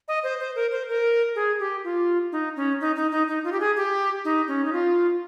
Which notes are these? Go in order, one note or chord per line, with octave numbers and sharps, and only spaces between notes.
D#5
C5
C5
A#4
C5
A#4
G#4
G4
F4
D#4
C#4
D#4
D#4
D#4
D#4
F4
G4
G#4
G4
D#4
C#4
D#4
F4